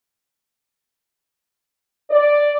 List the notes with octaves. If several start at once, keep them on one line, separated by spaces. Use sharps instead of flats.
D5